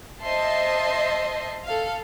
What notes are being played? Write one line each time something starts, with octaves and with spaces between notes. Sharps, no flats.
C5 D#5 E5 A5 C6
A4 F5